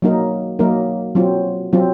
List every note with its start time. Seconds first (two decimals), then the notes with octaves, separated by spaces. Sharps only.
0.02 F#3 A#3 D#4 A#4
0.59 F#3 A#3 D#4 A#4
1.15 F#3 C4 F4
1.73 F#3 C4 F4